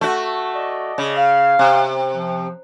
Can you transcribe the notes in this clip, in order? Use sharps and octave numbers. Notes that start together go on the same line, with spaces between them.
A3 F#4
D5 D#5
C#3
F5
C3
F3